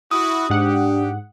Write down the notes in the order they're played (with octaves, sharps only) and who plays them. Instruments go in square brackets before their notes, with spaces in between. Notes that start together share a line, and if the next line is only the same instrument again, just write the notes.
[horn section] E4 F#4 [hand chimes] D#6
[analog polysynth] G#2 F#5 [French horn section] D4 [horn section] G4